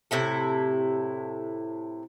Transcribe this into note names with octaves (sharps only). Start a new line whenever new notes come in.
A2 C3 E4 A4